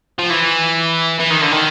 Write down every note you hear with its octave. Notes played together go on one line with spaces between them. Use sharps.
F3
E3
E3
D#3
D3
D#3